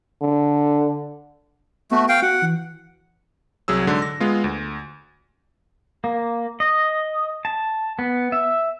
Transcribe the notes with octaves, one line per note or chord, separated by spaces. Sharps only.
D3
A3 B3 F#4
F5 G5
F#4 F#5
E3
C2 F#3 G#4 E6
G#2 D3
A#6
G#3 B3 F4
D2
A#3
D#5
A5
B3
E5